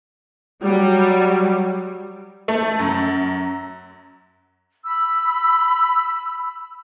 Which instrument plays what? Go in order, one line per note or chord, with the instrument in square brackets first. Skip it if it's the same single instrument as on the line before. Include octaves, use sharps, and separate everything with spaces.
[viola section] F#3 G3
[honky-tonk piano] A3
F#2
[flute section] B5 E6